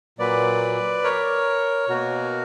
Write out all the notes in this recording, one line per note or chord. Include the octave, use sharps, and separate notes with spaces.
A#2 F#3 A#3 B4 D5
A#4 C#5
B2 A#3 F#4 A#4